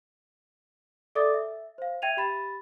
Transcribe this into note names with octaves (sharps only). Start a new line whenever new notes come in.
A4 D5 E5 D6 D#6 A6
E5
C5 F5
E5 G5 G#6 D#7 F7
G4 B5 A6